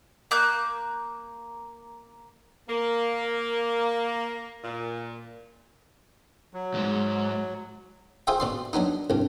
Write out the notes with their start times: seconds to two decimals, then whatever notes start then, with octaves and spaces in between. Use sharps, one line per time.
0.31 A#3 F#6 G6
2.69 A#3
4.64 A#2
6.54 F#3
6.74 C#2 G#2
8.27 F4 G#4 C5 E5 G5
8.40 B2 D5 C6
8.73 F#3 B3 D4 D#4
9.10 C2 G2